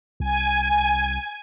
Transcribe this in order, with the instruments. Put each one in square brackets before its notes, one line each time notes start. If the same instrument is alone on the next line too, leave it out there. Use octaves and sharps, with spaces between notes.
[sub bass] C2 [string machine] G#5